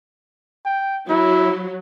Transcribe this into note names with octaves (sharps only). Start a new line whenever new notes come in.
G5
F#3 E4